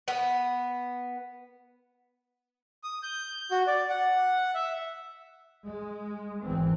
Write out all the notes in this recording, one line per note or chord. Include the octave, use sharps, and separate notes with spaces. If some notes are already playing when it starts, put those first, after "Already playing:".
B3
D#6
G6
F#4
D5
F#5
E5
G#3
G#1 E2 E3 C4